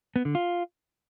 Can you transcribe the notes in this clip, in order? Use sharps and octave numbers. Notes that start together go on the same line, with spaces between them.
B3
D3
F4